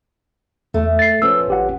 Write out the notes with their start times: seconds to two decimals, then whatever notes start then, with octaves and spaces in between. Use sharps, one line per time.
0.74 E2 A3
0.99 A6 C7
1.22 F3 B3 C#4 E6
1.48 G#1 G4 F#5